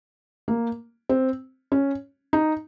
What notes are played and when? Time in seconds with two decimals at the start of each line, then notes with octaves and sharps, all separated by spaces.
0.48 A#3
1.09 C4
1.72 C#4
2.33 D#4